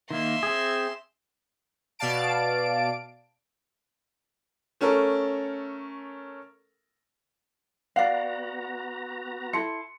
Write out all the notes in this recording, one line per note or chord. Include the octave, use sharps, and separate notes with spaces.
D#3 A#3 E5 C6
C4 G#4
B2 D5 F5 A5 D7
A3 C#4 A4 A#4
B3 F#4 D5 F5 F#5 A#5
E4 A4 C6 C#7